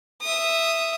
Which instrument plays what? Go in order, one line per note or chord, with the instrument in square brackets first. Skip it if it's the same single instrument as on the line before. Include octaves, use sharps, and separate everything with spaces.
[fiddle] E5 D#6